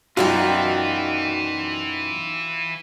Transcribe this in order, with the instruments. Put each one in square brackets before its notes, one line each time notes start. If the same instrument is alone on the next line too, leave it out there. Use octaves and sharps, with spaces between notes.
[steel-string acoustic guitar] F#2 B2 D#4 [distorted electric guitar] E3 [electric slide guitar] F4 D5 [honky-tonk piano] F#4 G5